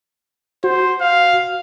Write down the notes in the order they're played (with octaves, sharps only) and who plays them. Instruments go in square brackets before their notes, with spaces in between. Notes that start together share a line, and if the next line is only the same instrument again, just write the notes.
[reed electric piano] F#4 [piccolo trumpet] C5
[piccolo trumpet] F5